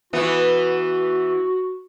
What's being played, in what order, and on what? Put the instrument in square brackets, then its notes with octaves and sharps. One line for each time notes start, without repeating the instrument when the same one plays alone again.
[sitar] E3 B3 [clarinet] F#4